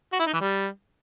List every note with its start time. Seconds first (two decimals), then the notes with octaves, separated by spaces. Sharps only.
0.13 F#4
0.20 E4
0.27 D#4
0.34 E3
0.41 G3